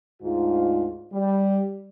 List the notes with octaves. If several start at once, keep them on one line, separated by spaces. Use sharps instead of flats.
D2 G#2 F4
G3